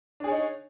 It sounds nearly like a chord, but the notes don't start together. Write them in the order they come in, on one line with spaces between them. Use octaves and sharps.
D4 G#4 C#5 D#4